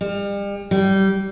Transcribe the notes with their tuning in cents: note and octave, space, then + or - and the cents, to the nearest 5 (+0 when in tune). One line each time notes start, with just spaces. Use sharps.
G3 +40
G3 -20